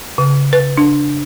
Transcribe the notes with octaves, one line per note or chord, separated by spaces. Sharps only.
C#3
B4
D4